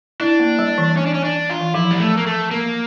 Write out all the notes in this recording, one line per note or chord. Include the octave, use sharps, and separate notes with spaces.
D4 E4
A#3
G3
E3
C#4
D4
C#4
D4
F4
E3
F3 E4
G3
A3
A#3
A3
A#3